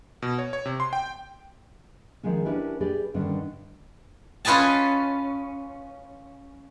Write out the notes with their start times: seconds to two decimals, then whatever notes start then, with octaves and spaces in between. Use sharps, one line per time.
0.22 B2
0.38 C#5
0.53 C#5
0.66 C3
0.80 C6
0.93 G5
2.23 D#3 F3 G#3 C#4
2.45 C#4 D4 E4 G4 A#4 B4
2.80 G4 G#4 B4 D5
3.14 G2 D3 D#3 C#4 D4
4.45 C#4 F4 B4 D#5 G#5 A5